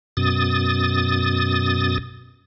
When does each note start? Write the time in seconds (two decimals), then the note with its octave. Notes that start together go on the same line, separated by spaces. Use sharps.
0.17 F#2 B2 D#6 A6